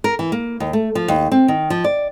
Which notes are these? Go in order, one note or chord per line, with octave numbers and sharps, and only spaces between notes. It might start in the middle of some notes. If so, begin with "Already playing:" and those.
A#4
E3
A#3
D#2
A3
F3
D#2
C4
D#3
F3
D5